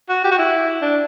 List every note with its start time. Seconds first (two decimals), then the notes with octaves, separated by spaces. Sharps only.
0.09 F#4
0.24 G4
0.31 F#4
0.38 E4
0.82 D4